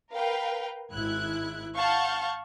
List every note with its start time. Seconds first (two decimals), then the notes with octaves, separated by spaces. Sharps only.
0.13 A#4 B4 F5 G5
0.92 G#1 G#3 E4 F#6 G#6
1.77 F5 F#5 A5 C#6 F6 G6